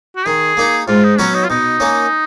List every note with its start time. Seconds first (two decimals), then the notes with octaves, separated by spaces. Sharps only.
0.16 F#4
0.26 D#3 G#4
0.57 A#3 D#4
0.88 G#2 F4
1.04 D#4
1.18 F#3 B3 C#4 F#4 C#5
1.34 D#4
1.44 F4
1.49 B2 D#4
1.80 A#3 C#4